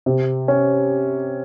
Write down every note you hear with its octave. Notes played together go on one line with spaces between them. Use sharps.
C3
C#4